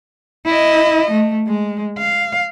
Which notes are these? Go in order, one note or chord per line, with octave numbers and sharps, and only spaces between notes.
E4 D#5
A3
G#3
F5